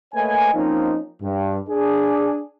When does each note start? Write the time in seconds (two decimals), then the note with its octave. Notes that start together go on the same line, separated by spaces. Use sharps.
0.14 A3 A#3 B4 C#5 D#5 G#5
0.54 F3 A#3 C4 C#4 D#4
1.22 G2
1.70 D4 G#4